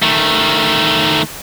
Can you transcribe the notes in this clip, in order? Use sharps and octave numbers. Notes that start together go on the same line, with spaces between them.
D#3 A3